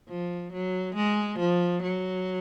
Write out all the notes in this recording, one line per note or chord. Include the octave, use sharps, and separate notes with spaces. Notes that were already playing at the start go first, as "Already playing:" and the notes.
F3
F#3
G#3
F3
F#3